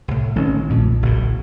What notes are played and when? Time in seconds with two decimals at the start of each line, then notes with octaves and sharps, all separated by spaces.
0.08 C2 A2
0.36 A1 D#3 A3 C4 C#4
0.70 B1 F2 A#2
1.02 F#1 A2